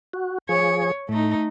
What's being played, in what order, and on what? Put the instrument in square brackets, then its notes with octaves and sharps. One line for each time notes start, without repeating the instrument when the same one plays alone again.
[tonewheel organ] F#4
[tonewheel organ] F3 G#4 [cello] C#5
[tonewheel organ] A2 [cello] A3 D#4